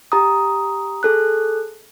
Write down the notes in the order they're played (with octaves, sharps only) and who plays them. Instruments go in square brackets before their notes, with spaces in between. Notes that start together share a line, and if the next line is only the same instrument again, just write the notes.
[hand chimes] G4 A#5 D#6
G#4 A4 F#6